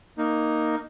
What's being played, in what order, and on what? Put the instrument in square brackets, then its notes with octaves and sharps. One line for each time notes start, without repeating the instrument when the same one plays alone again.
[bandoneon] A#3 D#4